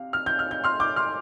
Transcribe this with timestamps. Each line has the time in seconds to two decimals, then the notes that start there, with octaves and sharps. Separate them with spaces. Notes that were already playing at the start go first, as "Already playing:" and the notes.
Already playing: C3 F5
0.13 F6
0.26 G6
0.39 F6
0.51 G6
0.64 C6 F6
0.80 D6 G6
0.96 C6 F6